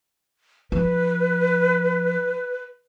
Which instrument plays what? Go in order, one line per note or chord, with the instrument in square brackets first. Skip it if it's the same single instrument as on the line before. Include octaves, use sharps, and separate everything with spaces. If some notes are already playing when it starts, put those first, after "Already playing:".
[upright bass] F3 [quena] B4